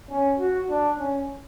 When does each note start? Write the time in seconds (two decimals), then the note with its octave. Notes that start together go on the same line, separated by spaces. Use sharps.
0.09 C#4
0.38 F#4
0.69 D4
0.98 C#4